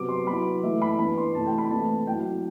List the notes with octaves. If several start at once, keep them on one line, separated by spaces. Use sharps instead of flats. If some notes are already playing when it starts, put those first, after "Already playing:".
Already playing: C3 F#3 B3 D6
C6
F#3 B3 E4 B5
E3 A3 E4 E5
B5
E3 B3 D4 B5
C6
C3 E3 A3 E4 A5
G5
B5
E3 A3 C4 E4 A5
F#3 C4 E4 G5